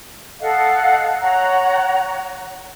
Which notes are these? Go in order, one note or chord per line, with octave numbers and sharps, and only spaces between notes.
A4 D#5 F5 F#5
C#5 F#5 A#5